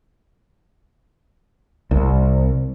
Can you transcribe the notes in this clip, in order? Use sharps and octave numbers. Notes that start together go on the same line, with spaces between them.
C2